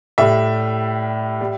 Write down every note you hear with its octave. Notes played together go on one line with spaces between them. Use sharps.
A2 G3 E5
G3